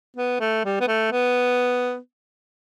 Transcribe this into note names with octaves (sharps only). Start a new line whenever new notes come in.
B3
A3
G3
B3
A3
B3